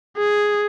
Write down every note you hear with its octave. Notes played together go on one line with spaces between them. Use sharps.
G#4